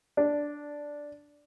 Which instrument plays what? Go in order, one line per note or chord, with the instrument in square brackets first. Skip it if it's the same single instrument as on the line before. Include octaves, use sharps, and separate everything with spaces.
[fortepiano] D4